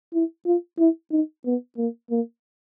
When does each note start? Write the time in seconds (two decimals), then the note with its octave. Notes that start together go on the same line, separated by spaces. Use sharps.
0.13 E4
0.46 F4
0.78 E4
1.11 D#4
1.45 B3
1.77 A#3
2.10 A#3